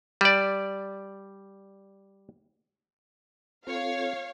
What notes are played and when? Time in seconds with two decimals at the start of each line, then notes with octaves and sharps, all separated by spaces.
0.21 G3 D5
3.67 C4 F4 A4 C#5 F5